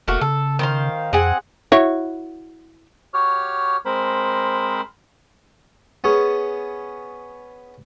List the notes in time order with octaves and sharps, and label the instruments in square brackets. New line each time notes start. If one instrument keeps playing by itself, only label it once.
[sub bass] E1 [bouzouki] A3 A#3 F#4
[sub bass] C#3 [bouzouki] A4
[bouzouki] D#3 C5 F5
[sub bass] F2 [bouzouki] C4 G#4 F#5
[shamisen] E4 F#4 C#5
[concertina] F#4 G4 C#5 F6
G#3 C4 A#4 C5 B5
[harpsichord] B3 C#4 G#4